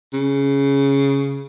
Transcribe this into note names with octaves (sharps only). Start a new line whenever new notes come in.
C#3